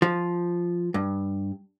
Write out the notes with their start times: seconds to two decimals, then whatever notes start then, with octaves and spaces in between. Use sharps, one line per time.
0.02 F3
0.94 G2